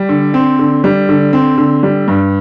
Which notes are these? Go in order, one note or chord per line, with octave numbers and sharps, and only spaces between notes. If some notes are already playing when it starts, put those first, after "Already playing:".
Already playing: G3
D3
C4
D3
G3
D3
C4
D3
G3
G2